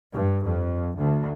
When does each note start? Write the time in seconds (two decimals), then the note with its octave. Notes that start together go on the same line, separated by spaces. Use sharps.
0.13 G2
0.45 F2
0.98 D2